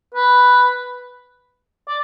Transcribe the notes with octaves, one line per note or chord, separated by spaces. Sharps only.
B4
D5